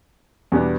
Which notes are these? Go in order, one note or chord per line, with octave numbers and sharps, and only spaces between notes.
E2 B2 G3 B3 D4